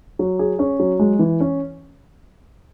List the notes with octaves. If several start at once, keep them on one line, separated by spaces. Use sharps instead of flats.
F#3
G#4
C#4
F#3
G#3
E3
C#4